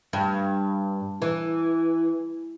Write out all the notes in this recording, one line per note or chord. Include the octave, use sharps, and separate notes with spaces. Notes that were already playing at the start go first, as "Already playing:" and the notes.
G2
E3